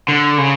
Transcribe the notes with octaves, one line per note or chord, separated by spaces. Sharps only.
D3
C#3